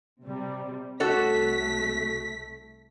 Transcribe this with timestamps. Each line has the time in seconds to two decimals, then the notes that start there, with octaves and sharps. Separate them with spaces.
0.24 C3 G3
1.00 C2 A3 F#4 A4 C#5 B6